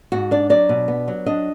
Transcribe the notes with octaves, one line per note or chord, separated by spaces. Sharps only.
G#2 F#4
D4 D5
F#3 D5
B2
B3
F#3
D4 D#5